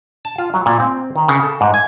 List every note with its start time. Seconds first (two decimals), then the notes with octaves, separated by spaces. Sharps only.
0.25 A5
0.38 F4
0.54 F#3
0.66 A#2
0.80 C4
1.16 D#3
1.28 C#3
1.43 A4
1.61 G#2
1.74 G#5